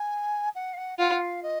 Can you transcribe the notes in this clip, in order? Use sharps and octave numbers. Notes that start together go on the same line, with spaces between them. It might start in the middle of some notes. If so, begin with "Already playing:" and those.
Already playing: G#5
F#5
F5
F#5
F4 F#5
F5
D#5